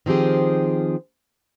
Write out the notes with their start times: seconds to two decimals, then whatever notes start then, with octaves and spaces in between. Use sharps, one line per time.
0.06 D#3 F3 C4 G4 G#4